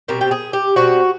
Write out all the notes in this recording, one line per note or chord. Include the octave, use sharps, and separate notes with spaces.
B2 G3 C4 A#4
G4
G#4
G4
B2 G3 C4 F#4